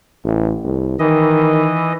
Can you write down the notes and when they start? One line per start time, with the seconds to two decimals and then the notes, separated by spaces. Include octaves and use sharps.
0.24 A1
0.65 C2
0.99 D#3 E3 D#5